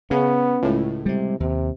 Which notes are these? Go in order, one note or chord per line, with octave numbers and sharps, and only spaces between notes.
C#3 B3 C#4
C#2 A2
C3 G3 G#3
D#2 C3